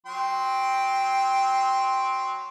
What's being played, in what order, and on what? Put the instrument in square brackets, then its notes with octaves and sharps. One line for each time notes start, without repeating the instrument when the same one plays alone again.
[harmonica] F#3 G5 C6